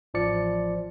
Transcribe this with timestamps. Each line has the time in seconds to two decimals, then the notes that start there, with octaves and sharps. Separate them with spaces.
0.14 A1 F3 D5 C#7